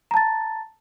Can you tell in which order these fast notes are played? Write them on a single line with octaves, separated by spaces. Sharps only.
A#5 A5 A6